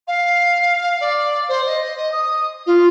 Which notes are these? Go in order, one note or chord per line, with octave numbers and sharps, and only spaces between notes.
F5
D5
C5
D#5
D#5
D#6
F4